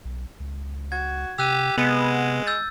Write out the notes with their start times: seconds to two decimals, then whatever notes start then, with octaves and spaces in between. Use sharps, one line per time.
0.05 B1
0.40 C#2
0.92 F#4 G#6
1.38 C3 G4 E6 F#6 D#7
1.78 C3 G#3 B3
2.47 E6 G6 A6